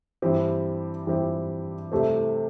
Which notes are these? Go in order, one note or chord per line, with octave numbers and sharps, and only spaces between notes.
G2 E3 C4 G4
G2 E3 C4 G4
C2 C3 A3 C4